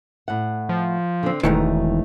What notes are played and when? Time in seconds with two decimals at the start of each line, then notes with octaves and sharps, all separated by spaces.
0.28 A2 F#5
0.69 F3
1.23 D3 C4
1.43 E1 G#2 D#3 E3 A3 D#4 C#5